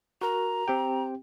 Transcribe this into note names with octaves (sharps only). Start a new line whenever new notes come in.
F#4 A#4 A#5
C4 G4 G5